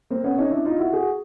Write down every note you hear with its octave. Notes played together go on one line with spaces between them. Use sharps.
A#3 C4
B3 C#4
C#4 D#4
D4 E4
D#4 F4
E4 F#4
F#4 G#4